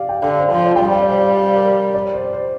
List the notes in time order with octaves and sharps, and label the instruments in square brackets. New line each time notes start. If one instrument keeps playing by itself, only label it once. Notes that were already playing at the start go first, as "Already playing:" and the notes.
Already playing: [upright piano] G4 D5 F5
G5
[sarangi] D3 [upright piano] F5
[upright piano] C5
[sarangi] F3 [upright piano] F5
[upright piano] D5
G5
[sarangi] G3 [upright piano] F5
[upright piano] F5
D5
C5
G4
F5
A#4
D5
C5
C5